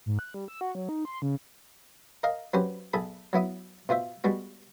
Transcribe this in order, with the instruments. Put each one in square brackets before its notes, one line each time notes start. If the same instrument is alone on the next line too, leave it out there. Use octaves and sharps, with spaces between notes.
[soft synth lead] G#2
F#6
G3
E6
F#4
F#3
D#4
C6
C#3
[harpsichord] A#4 D#5 F5
F#3 C4 C#4 G4 B4 C5
B1 G#4 A4 B5
F#3 B3 E4 D#6
B2 F4 C5 E5
G3 G#3 B3 F#4